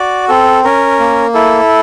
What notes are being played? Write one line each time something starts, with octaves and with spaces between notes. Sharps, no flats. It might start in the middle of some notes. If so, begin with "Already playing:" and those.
Already playing: F#4 D5
C4 A4
C#4 A#4
A#3
E4 A4